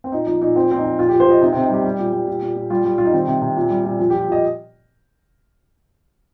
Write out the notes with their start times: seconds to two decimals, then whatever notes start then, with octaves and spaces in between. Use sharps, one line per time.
0.04 C4
0.12 A#2 D#4
0.26 F3 D#4
0.42 A#2 D#4
0.55 F3 C4
0.71 A#2 C4
0.77 D#4
0.84 F3
0.99 A#2 F4
1.09 G4
1.13 F3
1.20 C5
1.27 F3 D#5
1.41 C3 D#4
1.52 C4
1.56 C3
1.63 D#4
1.70 G3 G4
1.85 G3
1.99 A#2
2.13 G3
2.27 A#2
2.42 A#2
2.56 A#2
2.70 G3 F4
2.85 G3
2.98 G3 F4
3.05 D#4
3.13 D#3 C4
3.28 C3
3.42 C3
3.56 A#2
3.70 G3
3.85 A#2
3.99 F3
4.10 G4
4.14 F3
4.28 F3 D#5